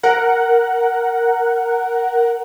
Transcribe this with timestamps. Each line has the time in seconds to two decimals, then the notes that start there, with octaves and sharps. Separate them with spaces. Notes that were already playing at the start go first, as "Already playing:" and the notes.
0.03 A#4 F#5